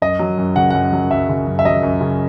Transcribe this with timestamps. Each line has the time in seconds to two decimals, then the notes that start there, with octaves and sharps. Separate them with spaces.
0.02 F#2 D#5
0.19 F#3
0.38 F#2
0.56 C#3 F#5
0.70 F#2 F#5
0.93 F#3
1.11 F#2 E5
1.29 C#3
1.47 F#2
1.59 E5
1.65 F#3 D#5
1.83 F#2
2.01 C#3